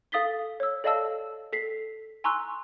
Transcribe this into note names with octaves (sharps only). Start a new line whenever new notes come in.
A4 F5 D#6 A6 B6 G7
C#5 E6
A4 D5 D#5 F5 A5 E6
A4 B6 C7
G#5 A#5 C6 C#6 E6 F#6